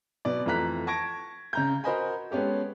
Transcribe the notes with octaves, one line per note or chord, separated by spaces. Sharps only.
B2 F#3 B3 D5
F2 E3 A3 A#5 F#6 B6
A5 C#6 G#6 A#6 D7
C#3 A#5 G6
F#4 A#4 C5 D#5 G#5 B5
G#3 B3 C#4 G4 A4